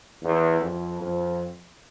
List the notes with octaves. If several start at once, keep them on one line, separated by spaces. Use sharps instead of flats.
E2
F2
F2